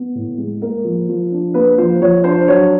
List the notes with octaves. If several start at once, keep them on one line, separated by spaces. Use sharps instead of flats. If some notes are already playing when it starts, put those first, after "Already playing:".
Already playing: B3
A2
G#3
A#3 A#4
F3
F3
D4
A#3 B4
F3 C5
F3 C#5
D4 C5
F#3 C#5